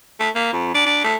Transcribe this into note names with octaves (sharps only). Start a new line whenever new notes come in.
A3
A#3
F2
D4
D4
A3